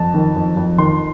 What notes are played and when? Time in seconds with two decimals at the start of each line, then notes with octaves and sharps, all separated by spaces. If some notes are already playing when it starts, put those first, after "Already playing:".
Already playing: F2 A5
0.14 D#3
0.36 F2
0.57 F2
0.78 D#3 C6